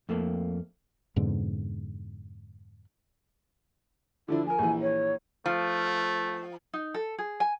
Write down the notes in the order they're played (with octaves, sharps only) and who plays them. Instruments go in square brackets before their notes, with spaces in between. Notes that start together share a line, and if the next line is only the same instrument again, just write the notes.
[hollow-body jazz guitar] F2 A3 A#3
[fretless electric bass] F2 G#2 B2 D3
[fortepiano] D3 F3 D4 [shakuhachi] E4
[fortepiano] F3 A#4 [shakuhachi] G#5
[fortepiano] A#1 E3
[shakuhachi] C#5
[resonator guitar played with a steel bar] F3 [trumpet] A3
[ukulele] D#4
A4
G#4
G#5